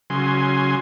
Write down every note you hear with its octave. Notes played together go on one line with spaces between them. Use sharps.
C#3 F#3 G#5 C6